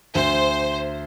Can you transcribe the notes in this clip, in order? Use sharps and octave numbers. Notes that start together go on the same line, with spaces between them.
D2 C5